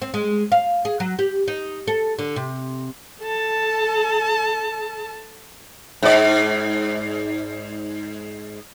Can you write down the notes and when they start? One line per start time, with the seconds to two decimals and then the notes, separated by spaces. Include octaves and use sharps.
0.02 C4
0.14 G#3
0.52 F5
0.85 G#4
1.00 F#3
1.19 G4
1.48 D#4
1.88 A4
2.19 D3
2.36 C3
3.22 A4 A5
6.02 G#2 D5